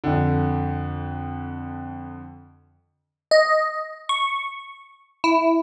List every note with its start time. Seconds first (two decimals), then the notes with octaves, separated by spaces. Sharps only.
0.04 F2 D3
3.31 D#5
4.09 C#6
5.24 E4